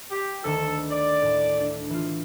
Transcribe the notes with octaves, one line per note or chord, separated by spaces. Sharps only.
G4
D2 D#3 A4 E7
D5
A2 A5
D4 A4
E3 F4